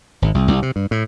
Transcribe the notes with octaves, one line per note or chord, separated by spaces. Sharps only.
G#1
C2
C2
C3
G2
A2